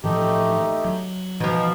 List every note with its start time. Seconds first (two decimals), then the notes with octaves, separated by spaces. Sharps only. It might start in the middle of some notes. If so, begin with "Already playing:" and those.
0.04 A2 E3 F3 A3 D#4 G4
0.85 F#3
1.40 B2 E3 F3 D#4